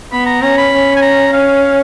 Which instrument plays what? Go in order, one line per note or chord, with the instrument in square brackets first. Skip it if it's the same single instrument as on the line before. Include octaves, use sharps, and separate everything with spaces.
[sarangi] B3 [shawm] B5
[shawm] A#5
[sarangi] C#4 [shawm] A#5
[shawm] B5
[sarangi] C#4
[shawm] G#5
A#5
[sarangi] C#4 [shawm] F5